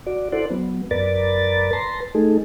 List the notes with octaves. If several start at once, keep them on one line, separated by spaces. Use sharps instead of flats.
F#4 D5
E4 A4 C5 D5 F#5
F#3 B3
F#2 A#4 B4 D5 A6
B4 A5 A#5 C6
A3 D#4 G#4 A4